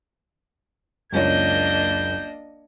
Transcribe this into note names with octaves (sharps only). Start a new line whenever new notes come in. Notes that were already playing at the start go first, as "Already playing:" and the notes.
F#1 C#2 A#3 D4 C#5 D#5 G6